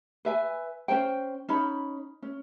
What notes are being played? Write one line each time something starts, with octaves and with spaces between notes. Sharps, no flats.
B4 E5 G#5
C#4 F4 C5 G5
C#4 D#4 B5
C#4